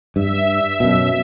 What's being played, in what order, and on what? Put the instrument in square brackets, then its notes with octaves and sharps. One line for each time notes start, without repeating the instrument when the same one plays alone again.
[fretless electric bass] G2 [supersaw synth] E5
[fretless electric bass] F#2 B2